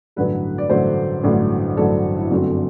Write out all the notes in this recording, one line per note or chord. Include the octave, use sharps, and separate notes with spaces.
A1 G2 D3 F#3 A3 B4
D5
A1 G2 D3 F#3 A3 C5
A1 G2 D3 F#3 A3
A1 G2 D3 F#3 A3 A4
E4
G1 F#2 D3 A3 C4 F#4